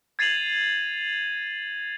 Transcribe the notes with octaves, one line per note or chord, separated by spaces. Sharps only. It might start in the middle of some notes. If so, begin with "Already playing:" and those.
G#6 A6 C7 D#7 F7 F#7